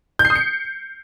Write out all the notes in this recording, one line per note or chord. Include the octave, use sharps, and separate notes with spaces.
G6
C7
D#6
C#7